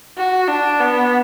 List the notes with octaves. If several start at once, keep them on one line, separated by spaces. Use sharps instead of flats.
F#4
D4
B3